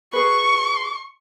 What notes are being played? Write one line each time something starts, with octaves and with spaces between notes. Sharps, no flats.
G#4 B4 C#6